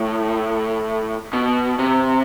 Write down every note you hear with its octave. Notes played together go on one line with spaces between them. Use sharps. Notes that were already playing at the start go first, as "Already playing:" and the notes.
Already playing: A2
B2
C3